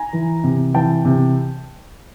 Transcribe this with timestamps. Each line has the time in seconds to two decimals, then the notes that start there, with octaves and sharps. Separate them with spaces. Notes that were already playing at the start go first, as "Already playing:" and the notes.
Already playing: G#5 A#5
0.13 E3
0.44 C3
0.74 E3 G5 A5
1.05 C3